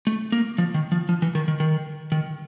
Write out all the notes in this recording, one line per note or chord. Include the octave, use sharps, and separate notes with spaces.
A3
A#3
F3
D#3
F3
F3
E3
D#3
D#3
D#3
D#3